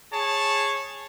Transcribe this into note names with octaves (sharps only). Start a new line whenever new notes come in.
G#4 C#5 A5